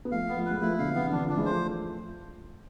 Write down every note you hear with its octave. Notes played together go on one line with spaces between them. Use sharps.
B3
F3 A3 F5
B3
F3 A3
B4
G#3
F3 A3 E4
B2 D3 F5
C3 E3 B3
D3
C3 E3 D4
D3 F3
D4
E3 G#3
F3 A3 C5